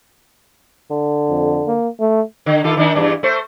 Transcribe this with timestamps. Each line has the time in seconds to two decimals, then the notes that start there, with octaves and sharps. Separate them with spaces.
0.90 D3
1.29 F2
1.67 A#3
2.00 A3
2.46 D3
2.64 D#3 F4 A4
2.77 D#3 D4 D#4
2.95 E2 G2 D4
3.23 A3 C5